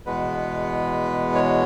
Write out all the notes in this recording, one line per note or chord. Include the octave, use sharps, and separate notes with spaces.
E2 B2 G#3 B3 B4
C#5